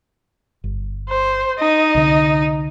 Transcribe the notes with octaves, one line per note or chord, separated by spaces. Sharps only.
G1
C5
D#4 D#5
C2 D3